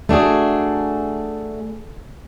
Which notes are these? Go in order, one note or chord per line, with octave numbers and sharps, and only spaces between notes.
A3 D4 F#4 G#4